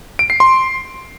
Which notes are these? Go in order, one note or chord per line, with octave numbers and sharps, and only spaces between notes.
D7
C7
C6